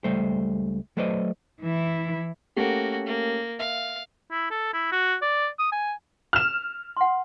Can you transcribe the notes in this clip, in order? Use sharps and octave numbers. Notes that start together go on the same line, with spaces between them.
C#2 G3 A3 C5
F#3 A3 B4 C5 D5 D#5
E3 E4
A3 A#3 C#4 F#4 G4
A#3
E5 F5
E4
A4
E4
F#4
D5
D#6
G#5
F6 E7
F#5 C6